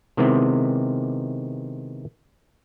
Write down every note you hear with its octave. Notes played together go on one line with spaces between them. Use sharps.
C3 D#3 G#3 B3 C4 E4